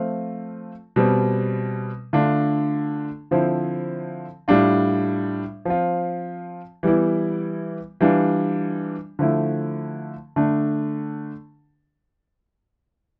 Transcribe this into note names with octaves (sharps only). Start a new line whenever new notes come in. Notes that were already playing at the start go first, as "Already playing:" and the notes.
Already playing: F3 A3 C4 F4
B2 G3 C4
D3 A3 D4 F4
D3 F3 C4 E4
A2 G3 D4 F4
F3 C4 F4
E3 G3 B3 E4
E3 G3 D4 F4
D3 F3 A3 E4
D3 A3 D4